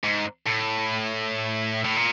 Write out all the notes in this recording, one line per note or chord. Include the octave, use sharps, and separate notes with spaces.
G#2
A2
A2
A#2